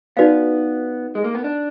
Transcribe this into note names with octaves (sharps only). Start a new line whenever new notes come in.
B3 D#4 F#4 B4 D5 F5
G#3
A#3
B3
D4